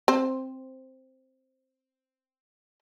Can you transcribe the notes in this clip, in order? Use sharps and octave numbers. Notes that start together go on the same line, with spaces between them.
C4 C5